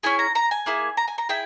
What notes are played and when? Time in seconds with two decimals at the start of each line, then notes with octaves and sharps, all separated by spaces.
0.03 C#4 E4 G#4 G#5
0.19 A#5
0.35 A#5
0.51 G#5
0.66 A#3 E4 G#4
0.97 A#5
1.08 G#5
1.18 A#5
1.29 E4 G#4 G5